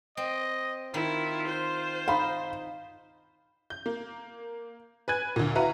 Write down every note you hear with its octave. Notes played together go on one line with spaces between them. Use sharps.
C4 D#5
D#3 E4 F4
C5
D#4 F5 B5
G6
A#3
B4 G#5 F#6 G#6
D2 A#2
E4 F#4 B4 E5 F5 A#5